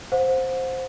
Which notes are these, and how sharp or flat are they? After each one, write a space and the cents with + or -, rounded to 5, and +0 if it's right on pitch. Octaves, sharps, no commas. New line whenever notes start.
C5 +0 F#5 -40